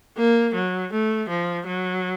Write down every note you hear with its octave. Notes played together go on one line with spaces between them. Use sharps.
A#3
F#3
A3
F3
F#3